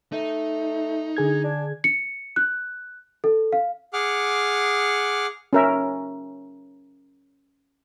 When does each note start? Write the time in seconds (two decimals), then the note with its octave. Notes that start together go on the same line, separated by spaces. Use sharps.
0.12 A3 D#4
1.17 D3 G#4 G#6
1.44 D4
1.84 C#7
2.36 F#6
3.24 A4
3.53 F5
3.93 G#4 F#5 D6 F6
5.53 C#4 A#4 E5